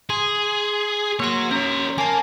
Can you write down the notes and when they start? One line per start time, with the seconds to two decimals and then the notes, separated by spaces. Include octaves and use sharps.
0.10 G#4 C6
1.20 A#3 F#4 C#5 C6
1.51 C#4 A#4 C#5
1.98 A#3 G#5 A5